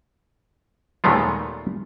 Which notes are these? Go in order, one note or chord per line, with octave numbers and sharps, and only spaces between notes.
D#2 A#2 G#3 A3 B3 F4